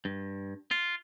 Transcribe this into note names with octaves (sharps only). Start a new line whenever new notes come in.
G2
F4